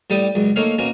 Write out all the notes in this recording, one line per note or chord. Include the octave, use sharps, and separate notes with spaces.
A2 G3 G4 D5 D#6
C#2 F#2
A3 A#3 D#4 C#5 F5
B2 A#3 C#4